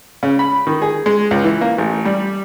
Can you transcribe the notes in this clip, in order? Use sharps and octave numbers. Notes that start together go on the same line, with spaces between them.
C#3
B5
D#3
G#4
G#3
C#2
E3
A#3
A1
G3